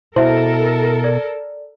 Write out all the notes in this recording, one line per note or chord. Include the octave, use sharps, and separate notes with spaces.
B2 E4 A4 A#4 C5 E5
D5